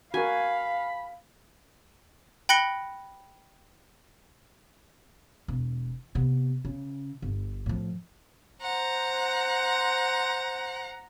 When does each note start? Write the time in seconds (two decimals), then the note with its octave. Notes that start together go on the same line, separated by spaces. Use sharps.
0.14 F#4 A#4 F5 G#5 B5
2.49 G5 B5 F#6 A#6 C#7 G7
5.48 E1
6.15 C3 B3
6.65 C#3
7.22 G1
7.66 A2 F3
8.61 C5 F#5 A#5